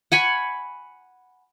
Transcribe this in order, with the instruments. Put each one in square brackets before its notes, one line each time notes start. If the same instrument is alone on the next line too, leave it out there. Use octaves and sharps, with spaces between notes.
[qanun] F#5 G#5 B5 C#6